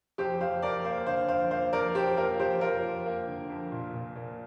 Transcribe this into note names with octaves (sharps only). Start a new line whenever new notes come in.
F2 G4 C5
F2 C5 F5
F2 A#4 D5
A#3 C5 F5
D3 C5 F5
F2 C5 F5
A#3 C5 F5
F2 A#4 D5
F2 G4 C5
A#3 F4 A#4
F2 G4 C5
F2 F4 A#4
F2
A#3
D3
F2
A#2
A#2
A#2